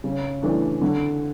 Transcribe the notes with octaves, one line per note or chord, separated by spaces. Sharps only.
C#3
E3 A3 D4
D3